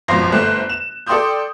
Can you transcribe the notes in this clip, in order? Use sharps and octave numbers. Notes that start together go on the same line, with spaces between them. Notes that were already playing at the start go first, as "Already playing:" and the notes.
G#1 F#2 B2 F3 C6 A#6
G1 A3 C5 F#6
E7
A4 D5 G5 C6 D#6 G6